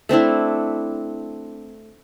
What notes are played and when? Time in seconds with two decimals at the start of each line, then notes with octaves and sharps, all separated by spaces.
0.09 A3 C4 D4 E4